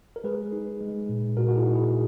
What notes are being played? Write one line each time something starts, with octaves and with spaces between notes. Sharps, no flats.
A#4
G#3 G#4 B4
D#4
G#3
A#2
A#2 F#4 A#4
F#4
E4 G#4
D#4
E4 G#4